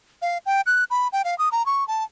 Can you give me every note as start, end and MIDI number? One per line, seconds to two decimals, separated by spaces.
0.22 0.38 77
0.46 0.61 79
0.66 0.84 90
0.90 1.08 83
1.13 1.22 79
1.25 1.37 77
1.38 1.49 87
1.52 1.65 82
1.66 1.86 85
1.88 2.04 81